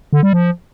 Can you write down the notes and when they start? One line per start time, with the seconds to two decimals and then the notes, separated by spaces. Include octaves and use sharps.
0.13 D3
0.23 G3
0.33 F3